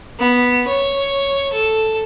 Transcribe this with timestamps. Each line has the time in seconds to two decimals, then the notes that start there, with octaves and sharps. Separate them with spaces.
0.19 B3
0.68 C#5
1.52 A4